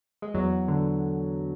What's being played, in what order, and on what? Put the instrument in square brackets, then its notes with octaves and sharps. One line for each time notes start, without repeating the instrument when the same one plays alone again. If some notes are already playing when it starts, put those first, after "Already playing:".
[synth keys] G#3
E2 F#3
D3